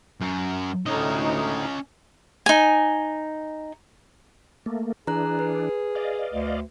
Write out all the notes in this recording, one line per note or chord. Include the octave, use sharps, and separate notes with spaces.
F#2
D2 A2 C#4 D#4 D#5
D#4 G#5
A3 A#3
E3 D4 G#4 A#5 F#6
B4
D5 D#5 F5
D2